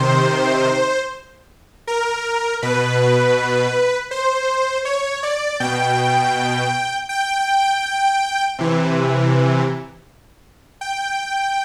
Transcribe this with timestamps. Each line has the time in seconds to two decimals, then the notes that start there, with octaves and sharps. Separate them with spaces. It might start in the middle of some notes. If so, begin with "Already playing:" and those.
Already playing: C3 D#3 C5
1.87 A#4
2.62 B2 B4
4.11 C5
4.85 C#5
5.23 D5
5.60 B2 G5
7.09 G5
8.58 C3 E3
10.81 G5